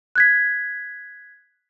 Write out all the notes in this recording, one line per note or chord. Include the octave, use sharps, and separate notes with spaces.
F#6 G#6 B6